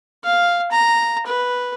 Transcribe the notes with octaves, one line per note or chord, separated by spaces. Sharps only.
F5
A#5
B4